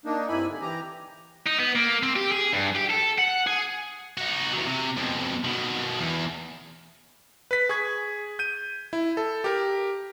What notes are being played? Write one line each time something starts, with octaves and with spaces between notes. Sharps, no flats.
A#3 D4 D#4
G2 C3 E4 G#5 B5
D3
E3 G4 A#5
D#4
B3
A#3
C4
G4
G#4
G2
G4
A4
F#5
G#4
D#4 F#4
E2 F#3
C3
F2 B2
B2 D#3
E2
B4 B6
G#4 C#6 G#6
G6 D#7
E4
A4
G4 A#4